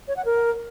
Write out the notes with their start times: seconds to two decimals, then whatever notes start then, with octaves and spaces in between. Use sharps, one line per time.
0.08 C#5
0.16 F#5
0.25 A#4